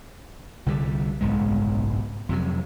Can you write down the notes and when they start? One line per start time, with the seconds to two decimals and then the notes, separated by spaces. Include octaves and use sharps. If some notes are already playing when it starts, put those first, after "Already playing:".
0.66 C2 D3 D#3 G3
1.21 F#1 B1 G#2 G#3
2.29 F2 C3 F#3